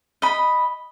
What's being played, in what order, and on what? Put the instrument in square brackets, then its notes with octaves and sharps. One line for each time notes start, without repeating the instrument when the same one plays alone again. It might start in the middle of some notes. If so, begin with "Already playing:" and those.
[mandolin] D#5 B5